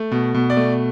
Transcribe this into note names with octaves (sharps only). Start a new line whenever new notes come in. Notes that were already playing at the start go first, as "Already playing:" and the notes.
Already playing: A3
B2
B2
D5
A3